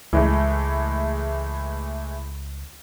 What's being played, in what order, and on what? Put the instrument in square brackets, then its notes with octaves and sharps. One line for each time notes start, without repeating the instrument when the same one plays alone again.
[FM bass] C#2 [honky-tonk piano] E3 G#3 A3